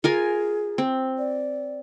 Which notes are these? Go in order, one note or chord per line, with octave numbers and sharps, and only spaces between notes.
F4 G#4 A#4 G#5
C4
D5